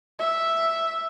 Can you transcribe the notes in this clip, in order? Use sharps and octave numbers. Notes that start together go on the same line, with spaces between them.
E5